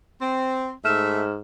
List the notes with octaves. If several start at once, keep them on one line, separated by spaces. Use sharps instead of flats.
C4
G#2 A3 E5 F6 E7